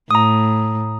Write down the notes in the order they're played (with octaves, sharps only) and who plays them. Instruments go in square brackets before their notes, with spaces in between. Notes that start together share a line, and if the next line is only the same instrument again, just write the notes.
[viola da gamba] A2 [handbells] A#5 D#6